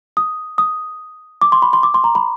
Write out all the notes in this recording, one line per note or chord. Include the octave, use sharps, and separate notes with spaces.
D#6
D#6
D6
C6
B5
C6
D6
C6
A#5
B5